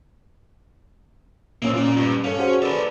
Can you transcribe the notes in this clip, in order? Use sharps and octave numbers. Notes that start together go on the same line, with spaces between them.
A#2 A#3 C4 C#4
F4 D5
G2
C#4 A4 F5
F#4 G#4 C5
A4 B4 D5